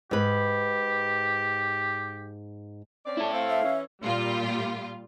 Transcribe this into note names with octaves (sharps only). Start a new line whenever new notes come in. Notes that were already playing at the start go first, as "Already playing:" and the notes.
G#2 G4 B4
C4 C#4 D5
E4 A4
A3 C4 F5
E5
E3 C#4
A#2 G3 F4